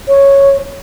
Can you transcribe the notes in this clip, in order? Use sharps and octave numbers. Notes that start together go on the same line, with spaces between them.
C#5